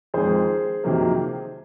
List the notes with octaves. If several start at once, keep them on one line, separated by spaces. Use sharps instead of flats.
F2 D#3 G#3 G#4 C5
F2 C3 D#3 F#3 A#3